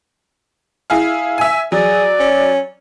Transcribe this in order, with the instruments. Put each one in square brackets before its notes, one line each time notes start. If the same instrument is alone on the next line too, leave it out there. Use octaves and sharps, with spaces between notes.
[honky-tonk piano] E4 G#4 F5
E5 G#5
[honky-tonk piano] F#3 [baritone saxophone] G#4 [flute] D5
[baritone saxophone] C#4